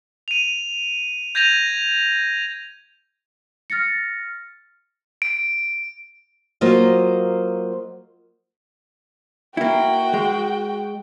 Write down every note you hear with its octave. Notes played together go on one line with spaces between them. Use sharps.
D#7 F7
G6 G#6 A#6 D#7 F7
F6 A6 A#6 C#7
D7
F#3 A#3 F4 C5 D#5
A#3 E4 F#4 G5
G#3